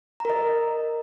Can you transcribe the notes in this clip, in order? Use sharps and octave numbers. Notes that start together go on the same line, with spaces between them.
A#4 D#5 A#5